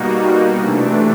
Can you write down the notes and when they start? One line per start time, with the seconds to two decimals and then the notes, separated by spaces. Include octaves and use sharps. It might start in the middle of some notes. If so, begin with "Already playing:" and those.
Already playing: B2 G3 A#3 D#4 F#4
0.57 C3 E3 A3 D4